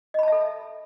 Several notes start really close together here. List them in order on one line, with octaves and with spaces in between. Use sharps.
D#5 B5 A5 E5 A4